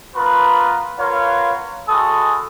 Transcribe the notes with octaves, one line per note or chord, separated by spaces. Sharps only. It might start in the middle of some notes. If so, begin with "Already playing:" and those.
B3 F4 A#4 B4
F4 A#4 B4 C#5 F5 F#5
G#3 F#4 A4 B5 D#6